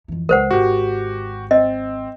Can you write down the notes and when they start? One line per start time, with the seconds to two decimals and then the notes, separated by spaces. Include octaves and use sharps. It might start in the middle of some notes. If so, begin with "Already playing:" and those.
0.08 F2 E3
0.29 C#2 A#4 C5 F#5
0.51 G#1 F#4 G4
1.51 C4 D#5